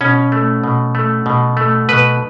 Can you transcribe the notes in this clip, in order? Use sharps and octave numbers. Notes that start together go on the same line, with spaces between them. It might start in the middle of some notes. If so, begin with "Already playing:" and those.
B2 C#4
A3
B2
A3
B2
A3
B2 B4